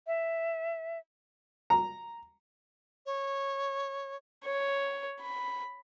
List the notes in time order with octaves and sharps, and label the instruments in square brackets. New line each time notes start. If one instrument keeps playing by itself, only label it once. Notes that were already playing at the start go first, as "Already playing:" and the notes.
[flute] E5
[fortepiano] A#5
[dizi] C#5
[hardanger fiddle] C#5
B5